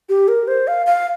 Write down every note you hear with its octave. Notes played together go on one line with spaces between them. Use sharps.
G4
A#4
C5
F5
F5